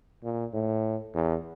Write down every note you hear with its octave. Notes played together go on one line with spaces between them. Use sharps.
A#2
A2
E2